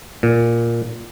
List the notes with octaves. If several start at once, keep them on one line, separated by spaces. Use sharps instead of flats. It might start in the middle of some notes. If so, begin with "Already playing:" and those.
A#2